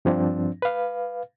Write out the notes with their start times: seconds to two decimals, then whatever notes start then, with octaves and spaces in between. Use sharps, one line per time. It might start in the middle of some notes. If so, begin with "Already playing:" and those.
0.05 G2 F3 C4 D4
0.62 B4 F5